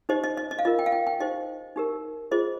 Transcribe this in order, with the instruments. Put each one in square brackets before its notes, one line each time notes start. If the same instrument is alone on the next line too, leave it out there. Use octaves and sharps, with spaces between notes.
[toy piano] D#4 G4 C5 D#5
D#5
D#5
D#5
F5
F4 A#4 D#5
G5
F5
G5
G5
D#4 G4 C5 D#5
D#4 G4 A#4
F4 G#4 C5 D#5